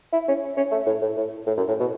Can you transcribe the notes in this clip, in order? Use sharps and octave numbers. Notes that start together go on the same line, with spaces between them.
E4
C#4
C#4
A3
A2
A2
A2
A2
F#2
A2
B2